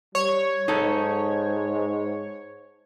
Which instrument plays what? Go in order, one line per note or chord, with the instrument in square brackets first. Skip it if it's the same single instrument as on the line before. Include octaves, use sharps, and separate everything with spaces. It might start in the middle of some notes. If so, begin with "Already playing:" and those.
[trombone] G3 [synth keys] C#5
[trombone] G#2 [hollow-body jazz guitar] D#4 A4